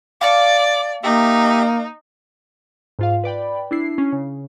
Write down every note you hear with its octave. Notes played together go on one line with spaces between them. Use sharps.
D5 F5 A5 C#6 D6
A#3 D#4 G4 E5
G#2 F4 F5
B4 D5 G5 B5
D4 E4 C7
C#4
C#3